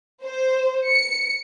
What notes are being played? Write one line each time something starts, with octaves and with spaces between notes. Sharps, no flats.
C5
C#7